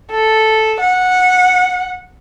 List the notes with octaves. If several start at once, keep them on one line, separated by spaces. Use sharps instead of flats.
A4
F#5